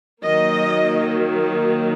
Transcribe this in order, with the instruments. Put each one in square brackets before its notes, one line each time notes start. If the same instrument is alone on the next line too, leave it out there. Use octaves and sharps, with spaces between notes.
[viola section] D#3 F#3 A#3 D#5